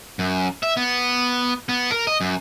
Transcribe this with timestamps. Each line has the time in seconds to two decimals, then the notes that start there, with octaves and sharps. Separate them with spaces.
0.19 F#2
0.63 E5
0.77 B3
1.69 B3
1.92 A#4
2.07 D#5
2.21 F#2